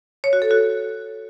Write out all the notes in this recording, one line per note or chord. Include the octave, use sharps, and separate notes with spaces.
C#5
F#4
A4
F#4